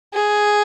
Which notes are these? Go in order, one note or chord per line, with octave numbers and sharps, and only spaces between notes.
G#4